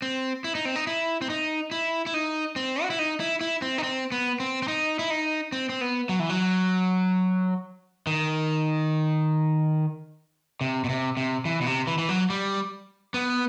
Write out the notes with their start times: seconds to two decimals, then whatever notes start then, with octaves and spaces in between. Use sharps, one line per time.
0.02 C4
0.44 E4
0.55 D#4
0.65 C4
0.76 D#4
0.87 E4
1.21 C4
1.30 D#4
1.71 E4
2.06 E4
2.14 D#4
2.56 C4
2.83 F#4
2.90 E4
2.99 D#4
3.20 E4
3.41 E4
3.62 C4
3.78 D#4
3.83 C4
4.12 B3
4.40 C4
4.62 C4
4.68 D#4
4.99 E4
5.10 D#4
5.52 C4
5.69 C4
5.81 B3
6.09 F#3
6.20 E3
6.29 F#3
8.07 D#3
10.61 C3
10.84 B2
10.89 C3
11.17 C3
11.45 E3
11.61 B2
11.66 C3
11.87 E3
11.98 E3
12.09 F#3
12.30 G3
13.14 B3